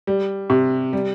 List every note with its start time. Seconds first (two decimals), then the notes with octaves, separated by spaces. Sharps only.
0.07 G3
0.50 C3
0.93 G3